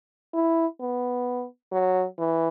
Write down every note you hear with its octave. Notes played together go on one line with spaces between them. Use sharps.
E4
B3
F#3
E3